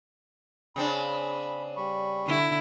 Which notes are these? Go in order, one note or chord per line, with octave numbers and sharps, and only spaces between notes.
C#3 C4 D4 B5
G3 B5 C#6
D3 E4